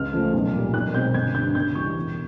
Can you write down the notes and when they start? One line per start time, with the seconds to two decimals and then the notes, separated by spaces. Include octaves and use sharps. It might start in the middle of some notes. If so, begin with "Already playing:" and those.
Already playing: C#2 F6
0.13 C#3 F3 A3
0.33 B1
0.53 A#2 G3
0.74 B1 F#6
0.94 B2 G#3 C4 G6
1.14 G1 G#6
1.35 G2 D3 G6
1.55 C#2 G6
1.75 C#3 E3 G3 C#6
1.96 E1